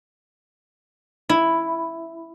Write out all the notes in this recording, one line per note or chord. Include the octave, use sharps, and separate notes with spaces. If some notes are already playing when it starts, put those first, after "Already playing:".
E4